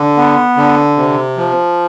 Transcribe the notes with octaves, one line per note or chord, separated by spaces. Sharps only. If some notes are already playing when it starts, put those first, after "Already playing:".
Already playing: D3
B3
D3
C3
F3